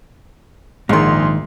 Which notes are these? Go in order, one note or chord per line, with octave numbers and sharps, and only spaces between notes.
A#1 G#2 D#3 G#4 C6